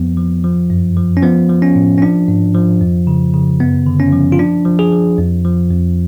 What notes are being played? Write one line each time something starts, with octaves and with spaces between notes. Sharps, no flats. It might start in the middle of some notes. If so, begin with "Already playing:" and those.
Already playing: F2 F3 B3
F3
F3
F#2
F3
C#4
F3 B3
F3
C#4
A2
C#4
F3 D4
G#2
F3
F2
C#3
C#3
F#2 B3
D3
C#4
F3
F4
F3 D4
F3
G#4
F3
F2
F3
F2